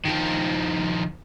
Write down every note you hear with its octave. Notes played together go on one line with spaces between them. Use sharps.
D#3 F3